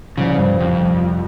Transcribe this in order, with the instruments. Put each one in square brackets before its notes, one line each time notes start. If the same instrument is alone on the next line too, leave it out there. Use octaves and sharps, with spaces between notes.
[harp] C2 A#2 F3 [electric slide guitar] C#3
[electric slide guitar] G2
F2